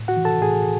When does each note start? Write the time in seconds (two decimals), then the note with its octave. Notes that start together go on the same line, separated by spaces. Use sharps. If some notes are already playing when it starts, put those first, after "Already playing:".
Already playing: A2
0.08 F#4 F#5
0.17 E3
0.25 A4 A5
0.41 A2 G#4 G#5